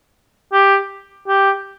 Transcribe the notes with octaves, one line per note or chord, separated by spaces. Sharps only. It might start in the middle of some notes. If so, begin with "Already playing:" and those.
G4
G4